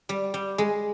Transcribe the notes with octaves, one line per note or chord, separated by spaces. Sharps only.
G3
G3
G#3